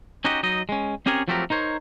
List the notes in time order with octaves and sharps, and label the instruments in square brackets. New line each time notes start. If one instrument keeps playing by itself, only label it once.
[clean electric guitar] C#4 D#4 F#4 G4 D#5
F#3 D#4 D#5
G#3 C#4
C4 C#4 G4 G#4 A#4 C#5
F3 F#3 A3 C4 G4 A#4
D#4 A#4 C5 C#5